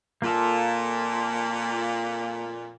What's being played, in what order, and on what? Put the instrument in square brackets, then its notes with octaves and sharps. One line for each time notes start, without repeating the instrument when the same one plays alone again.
[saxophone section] F2 A#2 [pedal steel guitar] A#3 F4 A4